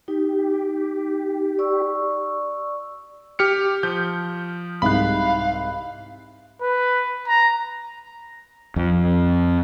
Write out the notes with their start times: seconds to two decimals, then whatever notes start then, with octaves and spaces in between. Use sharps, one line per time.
0.08 D#4 G4
1.58 D5 C#6 E6
3.39 G4 F6 C#7
3.83 F3 G6
4.82 C2 G#2 F5 B5 F#6
6.61 B4
7.28 A#5
8.76 F2